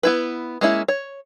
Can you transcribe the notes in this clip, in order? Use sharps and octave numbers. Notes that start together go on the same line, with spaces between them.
B3 E4 B4
G#3 A#3 C#4 E4
C#5